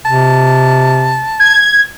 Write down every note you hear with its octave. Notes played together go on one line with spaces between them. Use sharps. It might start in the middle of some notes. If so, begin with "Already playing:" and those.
C3 A5
G#6